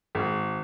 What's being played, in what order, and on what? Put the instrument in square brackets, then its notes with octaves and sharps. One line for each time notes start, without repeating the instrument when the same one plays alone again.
[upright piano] G#1